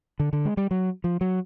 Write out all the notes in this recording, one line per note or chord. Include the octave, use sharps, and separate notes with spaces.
D3
D3
G#3
G3
F#3
F3
F#3